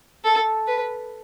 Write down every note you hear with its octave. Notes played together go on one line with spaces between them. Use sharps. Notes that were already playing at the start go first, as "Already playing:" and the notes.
A4
B4